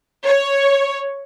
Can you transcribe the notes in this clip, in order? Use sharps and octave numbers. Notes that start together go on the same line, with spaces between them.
C#5